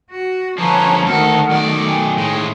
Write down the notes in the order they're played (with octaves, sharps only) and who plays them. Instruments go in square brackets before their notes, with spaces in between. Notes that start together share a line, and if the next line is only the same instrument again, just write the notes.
[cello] F#4
[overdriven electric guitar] D3 F3 [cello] C#4 [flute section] B4 A5 A#5
[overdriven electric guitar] D2 A4 [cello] D#3 A3 [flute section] A#4 F#5 F6
[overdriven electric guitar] B1 D5
[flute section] G5 G#5
[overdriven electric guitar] A2 G#3